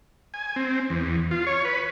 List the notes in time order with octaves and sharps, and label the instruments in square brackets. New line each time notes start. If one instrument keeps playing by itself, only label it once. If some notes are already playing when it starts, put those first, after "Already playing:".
[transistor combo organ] G#5
C4
E2
F4
C#5
B4